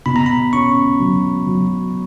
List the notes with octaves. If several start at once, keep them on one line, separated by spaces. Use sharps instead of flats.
B2 B5
A#5
B5
C#4 C#6
F#3
F#3